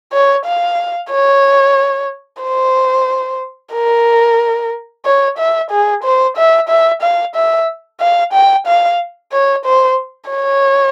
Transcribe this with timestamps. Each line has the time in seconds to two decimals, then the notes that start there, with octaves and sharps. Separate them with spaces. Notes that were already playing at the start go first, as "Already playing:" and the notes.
0.13 C#5
0.45 F5
1.11 C#5
2.42 C5
3.74 A#4
5.05 C#5
5.38 E5
5.71 G#4
6.04 C5
6.37 E5
6.69 E5
7.02 F5
7.35 E5
8.01 F5
8.33 G5
8.67 F5
9.33 C#5
9.65 C5
10.30 C#5